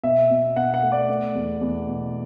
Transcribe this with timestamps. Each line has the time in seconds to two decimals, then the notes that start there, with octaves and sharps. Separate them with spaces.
0.03 B2 E5
0.30 B2
0.56 B2 F#5
0.74 F#5
0.83 A3
0.92 D5
1.09 A3
1.35 E2
1.61 E2
1.87 B2